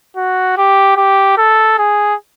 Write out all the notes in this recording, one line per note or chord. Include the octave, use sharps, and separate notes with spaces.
F#4
G4
G4
A4
G#4